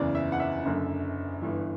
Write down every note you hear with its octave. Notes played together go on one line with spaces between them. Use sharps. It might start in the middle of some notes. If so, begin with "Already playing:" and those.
Already playing: F#1 E2 C#3 E3 D5
E5
F#5
E5
F#1 F#2 D3
G1 G2 E3